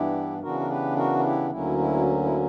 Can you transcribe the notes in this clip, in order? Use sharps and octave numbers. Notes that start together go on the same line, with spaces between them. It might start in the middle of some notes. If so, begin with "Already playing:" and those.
Already playing: G2 E3 B3 D4 E4 G4
C#3 E3 B3 D4 F#4 A#4
A#4
G4 B4
F#4 A#4
A#4
E4 G4
D2 D3 F#3 A#3 C#4 E4
E4
E4